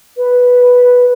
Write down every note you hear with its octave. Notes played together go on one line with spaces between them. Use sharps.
B4